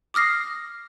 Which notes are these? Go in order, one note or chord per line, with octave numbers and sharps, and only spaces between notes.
D6 D#6 F6 A#6 C7